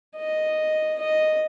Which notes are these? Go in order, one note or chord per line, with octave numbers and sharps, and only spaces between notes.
D#5
D#5